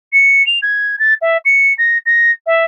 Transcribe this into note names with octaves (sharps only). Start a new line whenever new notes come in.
C#7
F7
G#6
A6
E5
C#7
A#6
A#6
E5